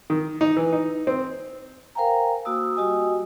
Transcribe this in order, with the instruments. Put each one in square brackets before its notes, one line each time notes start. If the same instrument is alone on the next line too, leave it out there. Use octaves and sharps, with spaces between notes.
[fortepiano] D#3
D#4
E3
D#4
C4
[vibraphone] A#4 C5 F5 G5 G#5 A#5
A#3 F#4 D#6 E6
G3 F#4 G4 D#5 G#5 D#6